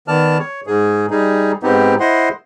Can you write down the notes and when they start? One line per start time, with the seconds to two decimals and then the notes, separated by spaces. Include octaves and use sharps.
0.08 D#3 B3 D5 A5 F6
0.39 C#5
0.67 G#2 G#4
1.11 G3 D#4 G#4
1.63 G#2 B3 C4 D#4 G4
2.00 E4 C5 D#5 F#5 C6